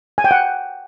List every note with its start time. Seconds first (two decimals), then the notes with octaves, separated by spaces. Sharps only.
0.18 G#5
0.24 G5
0.31 F#5